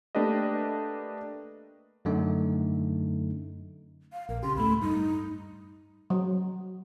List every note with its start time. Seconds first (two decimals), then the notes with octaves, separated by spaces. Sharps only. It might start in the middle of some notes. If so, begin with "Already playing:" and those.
0.15 A3 A#3 D4 G4 B4 D#5
2.05 F#2 D3 A3 D#4
4.13 F5
4.29 A#1 A#4
4.43 C#3 G4 C6
4.56 D2 A2 A3 B5
4.82 G2 D#4
6.10 F#3